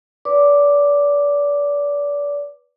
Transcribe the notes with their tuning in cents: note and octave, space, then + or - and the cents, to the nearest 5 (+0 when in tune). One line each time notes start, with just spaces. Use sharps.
B4 -10 D5 -30 D6 +0